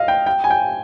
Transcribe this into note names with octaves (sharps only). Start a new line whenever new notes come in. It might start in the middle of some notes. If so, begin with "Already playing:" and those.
Already playing: D#5 F5
G5
G5
G#5
G5